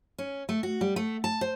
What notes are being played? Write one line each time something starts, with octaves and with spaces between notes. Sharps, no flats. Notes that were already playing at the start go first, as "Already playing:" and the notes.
C#4
A3
F#4
G3
A3
A5
C5